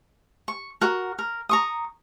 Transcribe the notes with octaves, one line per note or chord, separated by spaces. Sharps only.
C#6
F#4 A#4
A#4
A#5 C#6 D#6